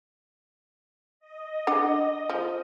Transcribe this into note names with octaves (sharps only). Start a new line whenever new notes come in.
D#5
D4 F#5
F3